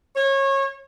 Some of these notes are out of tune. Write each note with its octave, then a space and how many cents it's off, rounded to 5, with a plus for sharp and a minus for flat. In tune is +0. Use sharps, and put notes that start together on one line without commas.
C#5 -25